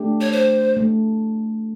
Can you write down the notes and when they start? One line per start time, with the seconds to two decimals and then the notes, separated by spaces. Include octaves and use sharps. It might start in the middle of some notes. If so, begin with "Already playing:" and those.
Already playing: A3 D4 G4
0.21 C#5
0.32 C5
0.76 A3